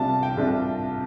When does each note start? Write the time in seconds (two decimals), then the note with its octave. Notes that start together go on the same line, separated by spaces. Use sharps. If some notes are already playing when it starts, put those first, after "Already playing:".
Already playing: C2 C3 G3 D4 F4 A5
0.23 G5
0.37 C2 C3 G3 D4 F4